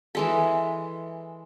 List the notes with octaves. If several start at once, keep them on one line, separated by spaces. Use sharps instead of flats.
E3 G#3 A4